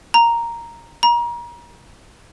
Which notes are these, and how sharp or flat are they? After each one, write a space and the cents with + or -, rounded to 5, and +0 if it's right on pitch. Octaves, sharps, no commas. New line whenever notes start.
A#5 +0
A#5 +35